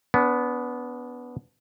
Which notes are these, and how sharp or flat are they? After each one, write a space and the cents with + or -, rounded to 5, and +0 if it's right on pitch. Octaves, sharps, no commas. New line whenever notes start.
B3 +0 D4 -35